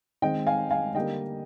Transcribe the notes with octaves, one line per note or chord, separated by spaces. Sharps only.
D#3 G#3 C4 D#5 G5
F5 G#5
F5 G#5
D3 G3 A#3 D#5 G5